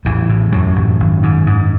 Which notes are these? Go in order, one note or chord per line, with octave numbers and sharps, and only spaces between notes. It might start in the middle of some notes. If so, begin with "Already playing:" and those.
A1 E2 E3
A2
F#2 A2 F#3
A1
G#1
G#2
G#2